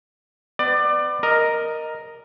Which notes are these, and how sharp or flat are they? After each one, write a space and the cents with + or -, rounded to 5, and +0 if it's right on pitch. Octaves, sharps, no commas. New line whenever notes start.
B3 +35 D5 +20
A#4 +0 D#5 +0